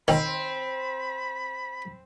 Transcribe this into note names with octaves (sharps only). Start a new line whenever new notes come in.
D#3 C4 B5